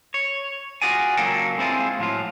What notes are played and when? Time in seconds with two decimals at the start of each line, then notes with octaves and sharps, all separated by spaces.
0.14 C#5
0.82 F4 F#4 G#4 D5 G#5
1.17 C#2 F#3 A#3 D4 A4 G5
1.58 G#3 C4 E4 F4 G#4
1.99 A2 F3 F#3 F4